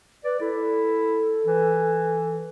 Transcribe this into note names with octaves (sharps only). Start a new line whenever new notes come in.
B4 D5
E4 A4
E3